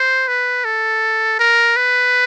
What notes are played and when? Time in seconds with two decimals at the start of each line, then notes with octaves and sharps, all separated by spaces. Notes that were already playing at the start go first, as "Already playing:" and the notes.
Already playing: C5
0.28 B4
0.65 A4
1.39 A#4
1.76 B4